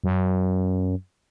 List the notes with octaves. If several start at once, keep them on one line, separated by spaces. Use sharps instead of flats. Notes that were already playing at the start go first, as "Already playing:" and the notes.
F#2